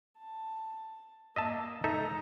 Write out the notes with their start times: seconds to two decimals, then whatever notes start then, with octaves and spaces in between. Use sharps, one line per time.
0.18 A5
1.36 A#3 D#5 E5 A5
1.84 G#3 D#4 A4 E5 A#5